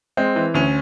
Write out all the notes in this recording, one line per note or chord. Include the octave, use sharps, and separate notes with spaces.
G#3 C4
E3
D2 C#4